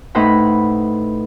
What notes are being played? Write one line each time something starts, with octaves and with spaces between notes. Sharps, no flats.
A2 D#4 B4 C5 F#5 B5